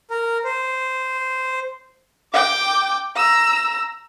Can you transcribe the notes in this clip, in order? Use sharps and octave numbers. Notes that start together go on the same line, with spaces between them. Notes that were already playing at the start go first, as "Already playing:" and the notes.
A#4
C5
G5 D6
A#5 E6